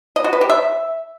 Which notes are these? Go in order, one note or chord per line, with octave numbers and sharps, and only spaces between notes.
D#5
F#4
B4
G4
E5